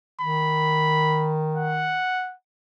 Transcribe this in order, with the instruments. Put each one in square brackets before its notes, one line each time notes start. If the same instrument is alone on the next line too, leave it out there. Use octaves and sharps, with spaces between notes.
[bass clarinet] D#3 [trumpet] B5
[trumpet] F#5